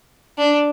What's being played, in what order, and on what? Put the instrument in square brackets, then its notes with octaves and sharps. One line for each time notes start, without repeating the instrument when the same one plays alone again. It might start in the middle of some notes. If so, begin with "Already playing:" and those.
[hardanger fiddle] D4